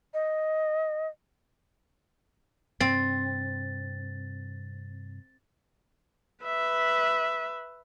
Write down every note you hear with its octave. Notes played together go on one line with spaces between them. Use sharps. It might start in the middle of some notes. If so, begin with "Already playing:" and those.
D#5
G2 C3 C4 A6
B4 E5